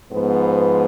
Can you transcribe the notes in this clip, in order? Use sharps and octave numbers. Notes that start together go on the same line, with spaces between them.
G#2 F3 B3